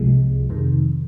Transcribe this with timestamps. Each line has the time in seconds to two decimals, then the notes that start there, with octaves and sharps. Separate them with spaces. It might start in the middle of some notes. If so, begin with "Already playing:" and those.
Already playing: C2 C3 F3 G#3
0.50 F2 C3 D#3